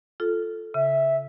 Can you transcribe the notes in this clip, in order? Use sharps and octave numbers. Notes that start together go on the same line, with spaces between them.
F4 A4
C#3 E5